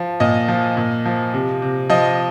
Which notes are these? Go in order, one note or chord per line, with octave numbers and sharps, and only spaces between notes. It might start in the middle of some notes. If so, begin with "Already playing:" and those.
Already playing: F3
A#2 D#5
F3
A#2
F3
C3
C3
F3 D#5